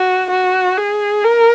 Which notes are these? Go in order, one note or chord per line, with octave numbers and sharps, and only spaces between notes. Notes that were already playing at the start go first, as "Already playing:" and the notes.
Already playing: F#4
F#4
G#4
A#4